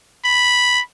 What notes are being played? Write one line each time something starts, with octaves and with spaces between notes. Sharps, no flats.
B5